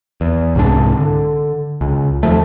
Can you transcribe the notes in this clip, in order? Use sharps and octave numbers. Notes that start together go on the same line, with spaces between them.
E2
C2 G#2 D4
D3
C#2
D#2 F3 A3